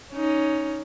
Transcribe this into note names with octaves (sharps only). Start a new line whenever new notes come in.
C#4 D#4